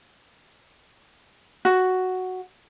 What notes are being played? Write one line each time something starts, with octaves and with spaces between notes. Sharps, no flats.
F#4